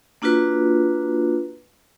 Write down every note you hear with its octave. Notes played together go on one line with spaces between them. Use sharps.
A#3 D4 F4 F#4 B4